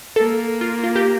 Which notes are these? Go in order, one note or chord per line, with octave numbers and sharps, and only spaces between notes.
A#3 A4
F4
F4
G4